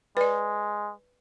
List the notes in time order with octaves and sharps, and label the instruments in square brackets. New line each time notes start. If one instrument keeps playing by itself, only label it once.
[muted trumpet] G#3 [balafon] B4 D5